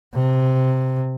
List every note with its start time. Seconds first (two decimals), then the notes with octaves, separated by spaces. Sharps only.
0.14 C3